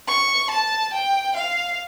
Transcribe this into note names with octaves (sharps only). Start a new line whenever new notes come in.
C#6
A5
G5
F5